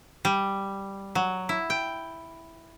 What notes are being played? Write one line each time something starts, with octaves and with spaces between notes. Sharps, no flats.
G3
F#3
E4
G5